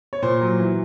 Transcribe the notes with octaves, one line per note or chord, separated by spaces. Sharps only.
C#5
A#2 C5
F#3
E3